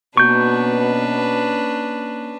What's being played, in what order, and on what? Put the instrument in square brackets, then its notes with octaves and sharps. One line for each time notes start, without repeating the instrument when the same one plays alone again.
[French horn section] B2 [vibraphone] A#3 [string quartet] C#4 D4 B4 [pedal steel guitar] C#6 G6